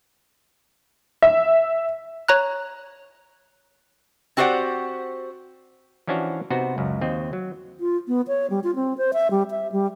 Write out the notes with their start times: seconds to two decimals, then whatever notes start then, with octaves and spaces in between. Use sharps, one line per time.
1.22 E5
2.28 C#5 A#5 F#6
4.37 C4 F#4 G4 C5 D5 F#5
6.07 E3 F3 C#4 D4 F#4 C#5
6.50 C3 B3 D#4 F#4 C5
6.78 C#2 F#2
7.01 D#2 C4 D#5
7.33 F#3
7.80 F4
8.08 B3
8.28 C#5
8.50 G3
8.64 F4
8.75 C4
8.98 C5
9.13 E5
9.31 G3
9.51 E5
9.72 G3